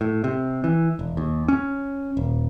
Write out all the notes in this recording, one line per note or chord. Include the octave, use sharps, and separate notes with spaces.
A2
C3
E3
E1
D#2
C#4
D#1